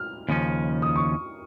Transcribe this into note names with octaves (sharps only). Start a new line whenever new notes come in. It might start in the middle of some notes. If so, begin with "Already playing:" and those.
Already playing: F6
D#2 C#3 F3 C#4
D#6
C#6